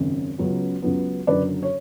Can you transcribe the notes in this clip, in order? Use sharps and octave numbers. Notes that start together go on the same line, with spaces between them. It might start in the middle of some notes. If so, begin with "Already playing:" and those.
Already playing: G#1 F#2 C#3
C#2 C#3 F#3 B3
C#2 C#3 F#3 B3
F#1 F#2 D3 F#3 B4 D5
C#5